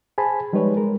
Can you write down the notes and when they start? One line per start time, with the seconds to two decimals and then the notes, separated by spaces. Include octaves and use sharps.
0.18 G#4 C5 G#5 A5 B5
0.53 F3 G3 G#3 D#4 B4 C#5
0.77 G#3 A#4